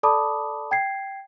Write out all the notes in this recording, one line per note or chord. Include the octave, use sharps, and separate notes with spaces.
A4 D5 A5 B5 D6 D#6
G5 G#6 C7